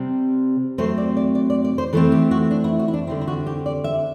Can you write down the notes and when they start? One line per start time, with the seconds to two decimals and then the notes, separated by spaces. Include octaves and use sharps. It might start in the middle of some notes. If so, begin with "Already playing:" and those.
Already playing: C3 G3 C4
0.78 C3 F#3 A3 C4 C5
0.98 D5
1.17 D5
1.35 D5
1.50 D5
1.64 D5
1.78 C5
1.93 E3 A3 C4 A4
2.12 G4
2.31 F#4
2.51 D4
2.64 E4
2.79 F#4
2.88 E4
2.94 D4
3.07 D3 G3 C4 E4
3.21 E4
3.27 F#4
3.47 G4
3.66 D5
3.84 E5